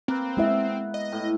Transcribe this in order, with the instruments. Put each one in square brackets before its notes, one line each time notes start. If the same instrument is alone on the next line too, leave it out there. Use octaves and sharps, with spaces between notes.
[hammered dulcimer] A#3 B4 [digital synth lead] C4
[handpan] G#3 E4 E5 [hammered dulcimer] B3
[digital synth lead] D#5
[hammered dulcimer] A2 E4